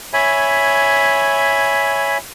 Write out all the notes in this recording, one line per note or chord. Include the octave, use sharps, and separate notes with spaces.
C#5 E5 G#5 B5